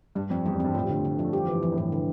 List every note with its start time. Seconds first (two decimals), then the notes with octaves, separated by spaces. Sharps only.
0.15 G2 G3
0.30 F2 C4
0.46 E2 G3
0.54 F2
0.60 G2 C4
0.75 A2 F3
0.84 G3
0.89 D3 A3
1.05 D3
1.19 F3
1.25 A3
1.33 G3 G4
1.43 F3
1.48 G2 E3
1.62 F2 E3
1.72 A2
1.78 G2 E3
1.92 D3